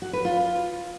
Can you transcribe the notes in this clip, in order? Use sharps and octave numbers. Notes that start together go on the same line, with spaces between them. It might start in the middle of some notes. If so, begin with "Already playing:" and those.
F#4
B4
F4